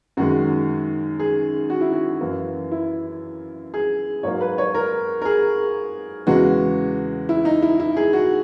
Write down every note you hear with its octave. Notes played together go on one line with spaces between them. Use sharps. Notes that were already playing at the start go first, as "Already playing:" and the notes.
F#2 D#3 G#3 F#4
G#4
F#4
E4
F#4
F#2 E3 A#3
E4
G#4
G#2 F#3 A#3 C#5
B4
C#5
A#4
A#4
G#4
E2 C#3 E3 G#3 F#4
E4
D#4
E4
E4
G#4
F#4